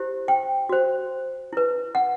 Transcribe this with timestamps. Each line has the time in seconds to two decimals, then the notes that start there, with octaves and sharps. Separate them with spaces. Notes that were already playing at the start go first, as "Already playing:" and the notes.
Already playing: E4 G4 C5
0.28 G5
0.69 F#4 C5
1.53 E4 B4
1.95 F#5